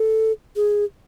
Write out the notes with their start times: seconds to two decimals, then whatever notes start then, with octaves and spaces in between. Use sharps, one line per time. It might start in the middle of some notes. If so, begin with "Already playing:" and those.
Already playing: A4
0.56 G#4